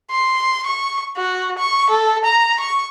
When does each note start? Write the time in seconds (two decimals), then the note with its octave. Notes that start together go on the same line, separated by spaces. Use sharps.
0.11 C6
0.66 C#6
1.17 F#4
1.58 C#6
1.90 A4
2.25 A#5
2.60 C#6